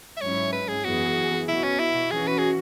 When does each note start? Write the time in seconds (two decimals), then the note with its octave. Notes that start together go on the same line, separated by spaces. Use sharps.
0.17 E5
0.21 G#2 F#3 C#4 E4 C#5
0.53 B4
0.68 G#4
0.84 F#2 E3 B3 E4 F#4 G#4
1.47 B2 B3 E4 F#4
1.64 C#4
1.79 E4
2.11 E3 C#4 F#4 G#4
2.27 B4
2.38 G#4